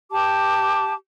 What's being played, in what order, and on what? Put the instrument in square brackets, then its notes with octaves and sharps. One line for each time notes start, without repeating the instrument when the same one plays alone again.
[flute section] G4 A5 D6